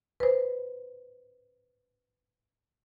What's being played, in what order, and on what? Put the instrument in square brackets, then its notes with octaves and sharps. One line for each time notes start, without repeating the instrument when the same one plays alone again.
[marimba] B4 C5